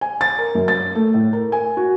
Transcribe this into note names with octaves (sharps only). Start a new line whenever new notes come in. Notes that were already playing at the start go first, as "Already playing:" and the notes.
G#5
A6
A#4
F#2
A6
A3
A2
A#4
G#5
F#4